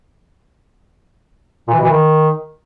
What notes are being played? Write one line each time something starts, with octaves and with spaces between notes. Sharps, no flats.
A#2
E3
B2
E3
D#3